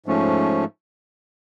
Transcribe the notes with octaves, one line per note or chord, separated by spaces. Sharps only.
G#2 F3 A3 C#4